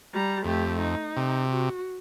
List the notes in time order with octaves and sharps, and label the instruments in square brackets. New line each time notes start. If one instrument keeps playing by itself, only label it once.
[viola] G3 A#5
[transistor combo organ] F2 [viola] A3 G4
[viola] D#4
[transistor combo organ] C3
[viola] F#4